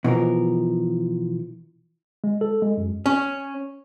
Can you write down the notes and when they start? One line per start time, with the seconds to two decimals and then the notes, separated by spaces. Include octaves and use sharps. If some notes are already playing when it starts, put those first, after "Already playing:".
0.04 B2 E3 F3 A#4
2.24 G#3
2.41 A4
2.62 G#3
2.78 F#2
3.06 C#4